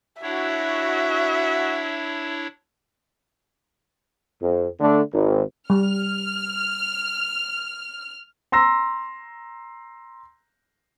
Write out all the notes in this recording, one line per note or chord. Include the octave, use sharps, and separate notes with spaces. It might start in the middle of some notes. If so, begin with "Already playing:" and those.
D4 E4 F#4 C#5 E5
F2
D3 A3 D4
G#1
G3 F6
A#5 C6 E6 A#6